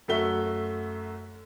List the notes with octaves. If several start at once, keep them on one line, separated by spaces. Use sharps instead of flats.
F#2 A3 F#4 E5 G7